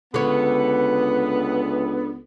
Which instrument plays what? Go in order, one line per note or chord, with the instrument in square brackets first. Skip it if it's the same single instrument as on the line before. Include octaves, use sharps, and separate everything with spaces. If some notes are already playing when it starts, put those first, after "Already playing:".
[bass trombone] C#2 [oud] D3 C#5 [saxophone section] B3